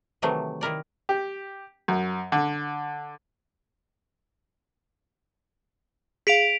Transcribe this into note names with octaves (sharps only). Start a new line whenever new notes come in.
C3 D#3 E3 F#3 A3
D#3 E4 A#4 D5
G4
F#2
D3
G#4 F5 B6 D7 F7